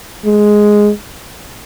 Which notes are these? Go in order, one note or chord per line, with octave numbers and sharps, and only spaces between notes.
G#3